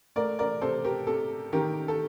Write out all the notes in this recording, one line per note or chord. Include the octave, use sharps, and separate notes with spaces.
A3 A#4 D5
A#4 D5
C3 A4 C5
G4 A#4
C3 A4
D#3 G4 A#4
A4